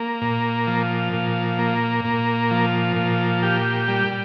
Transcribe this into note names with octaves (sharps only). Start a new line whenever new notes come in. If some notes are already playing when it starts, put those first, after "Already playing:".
Already playing: A#3
A#2
F3
A#2
A#3
A#2
F3
A#2
G4
G3